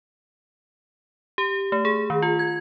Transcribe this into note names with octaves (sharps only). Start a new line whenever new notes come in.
G4
A3
G#4
D#3
F4
G#6